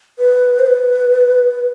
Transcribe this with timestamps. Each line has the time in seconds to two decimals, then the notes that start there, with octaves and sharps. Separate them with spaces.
0.19 B4
0.59 C5
0.66 B4